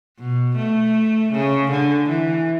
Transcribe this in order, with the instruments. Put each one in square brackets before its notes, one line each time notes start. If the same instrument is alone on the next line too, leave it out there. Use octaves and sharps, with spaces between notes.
[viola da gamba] B2
A3
C#3
D3
E3